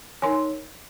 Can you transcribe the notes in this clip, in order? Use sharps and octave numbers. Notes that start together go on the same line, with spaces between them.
D#4 A#4 C#5 G#5 C6